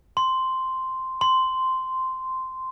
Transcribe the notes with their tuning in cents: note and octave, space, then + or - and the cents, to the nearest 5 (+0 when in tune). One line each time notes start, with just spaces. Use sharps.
C6 -5
C6 -10